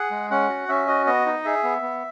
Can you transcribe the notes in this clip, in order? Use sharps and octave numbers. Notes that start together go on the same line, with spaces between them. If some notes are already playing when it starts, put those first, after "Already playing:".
Already playing: G#4 F#5
G#3
C#4 F#5
F#4
C#4 E5
F#4 D#5
B3 D#5
D#4
G#4 E5
B3
B3